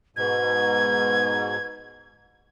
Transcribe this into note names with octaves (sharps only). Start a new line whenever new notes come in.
G#2 B2 B4 G#6